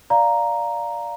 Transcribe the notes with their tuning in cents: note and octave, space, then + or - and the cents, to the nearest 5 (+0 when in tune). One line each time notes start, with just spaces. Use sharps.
D5 +0 F5 +0 A#5 +0